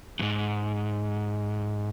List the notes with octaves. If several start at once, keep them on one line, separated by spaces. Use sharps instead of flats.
E2 G#2